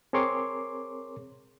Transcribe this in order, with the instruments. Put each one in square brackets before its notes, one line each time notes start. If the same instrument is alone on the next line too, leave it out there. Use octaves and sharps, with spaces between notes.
[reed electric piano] C4 G#4 A#4 C#5 C6 D6